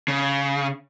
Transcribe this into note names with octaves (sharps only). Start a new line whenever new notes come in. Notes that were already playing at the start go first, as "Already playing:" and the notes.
C#3